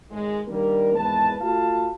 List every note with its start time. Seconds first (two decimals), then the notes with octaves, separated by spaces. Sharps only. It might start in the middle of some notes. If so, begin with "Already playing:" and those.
0.11 G#1 G#3
0.47 D#3 G3 A#3 D4 A#4
0.95 G#1 E2 G#3 B4 A5
1.41 A3 F4 F#4 F5 A5